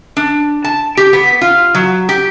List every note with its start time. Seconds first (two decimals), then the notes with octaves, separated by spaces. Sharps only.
0.17 D4
0.64 A5
0.97 G4
1.13 B3
1.41 F4
1.75 F#3
2.09 G4